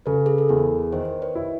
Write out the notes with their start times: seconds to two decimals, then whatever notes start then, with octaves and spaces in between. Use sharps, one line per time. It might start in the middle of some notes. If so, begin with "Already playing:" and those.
0.06 C#3 A4 B4
0.26 G#4
0.38 A4
0.49 E2 G#4 A#4
0.93 D#3 A#4 C5
1.22 B4 C#5
1.35 E4